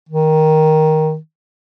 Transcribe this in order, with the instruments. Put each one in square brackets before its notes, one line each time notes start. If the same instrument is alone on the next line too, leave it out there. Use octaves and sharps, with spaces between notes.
[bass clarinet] D#3